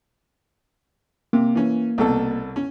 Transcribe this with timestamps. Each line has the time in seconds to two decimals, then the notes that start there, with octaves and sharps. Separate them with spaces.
1.33 C3 A#3
1.55 E3 C#4
1.98 C2 B2 A4
2.56 C#4